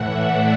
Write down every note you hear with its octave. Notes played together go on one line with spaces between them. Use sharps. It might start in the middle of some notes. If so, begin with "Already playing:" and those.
Already playing: A2 E3 E5 F#5
D5